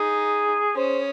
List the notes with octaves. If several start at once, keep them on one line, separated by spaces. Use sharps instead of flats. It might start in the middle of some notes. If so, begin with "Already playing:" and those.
Already playing: D#4 G#4
C#4 C5